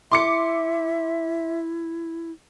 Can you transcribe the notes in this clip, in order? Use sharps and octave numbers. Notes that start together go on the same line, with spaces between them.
E4 E5 C6 D6 C#7